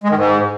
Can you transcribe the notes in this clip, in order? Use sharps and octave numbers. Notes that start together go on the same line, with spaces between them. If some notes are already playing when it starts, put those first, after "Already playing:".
G#3
D#3
G#2